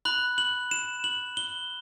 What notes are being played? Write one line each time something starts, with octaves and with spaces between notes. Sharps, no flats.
B5 F#6 F#7
F#7
E7
F#7
G7